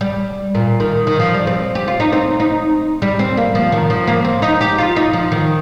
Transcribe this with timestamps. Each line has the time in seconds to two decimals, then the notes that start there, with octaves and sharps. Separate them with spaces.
0.01 G3
0.55 A#2
0.80 D#3
1.07 D#3
1.20 F3
1.34 G3
1.47 C4
1.75 G4
1.88 F4
2.00 D#4
2.12 C4
2.40 D#4
3.02 G3
3.19 C4
3.37 A#3
3.55 F3
3.72 D#3
3.90 F3
4.07 A#3
4.24 C4
4.42 D#4
4.61 G4
4.78 F4
4.96 D#4
5.13 F3
5.32 D#3